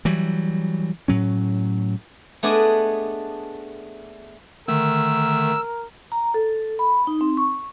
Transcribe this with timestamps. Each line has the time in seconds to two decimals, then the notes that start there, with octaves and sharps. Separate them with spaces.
0.05 E3 F#3 G3
1.08 A2 F#3 C#4
2.43 A3 B3 D4 G#4 D5 D#5
4.68 D3 D#3 A3 A#4 E6
6.12 A#5
6.34 A4
6.79 B5
7.07 D#4
7.21 C4
7.37 C#6